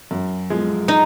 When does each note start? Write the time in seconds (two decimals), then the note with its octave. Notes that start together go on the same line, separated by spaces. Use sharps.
0.11 F#2
0.50 F3 G#3
0.88 D#4